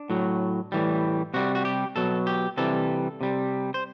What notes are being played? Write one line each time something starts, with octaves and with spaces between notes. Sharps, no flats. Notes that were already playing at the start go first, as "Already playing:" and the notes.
Already playing: D4
A2 F#3
A2 E3 G3
C3 G3 F#4
F#4
G4
B2 F#3 A4
G4
C3 E3 G3 A4
C3 G3
C5